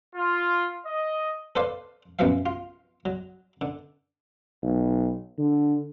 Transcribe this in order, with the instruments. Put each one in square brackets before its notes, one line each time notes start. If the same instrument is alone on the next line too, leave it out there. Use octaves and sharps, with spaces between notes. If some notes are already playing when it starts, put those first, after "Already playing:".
[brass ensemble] F4
D#5
[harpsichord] A4 B4 C5 D5 F5
F#2 B2 F3 E5 F5
F4
F#3
D3
[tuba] B1
D3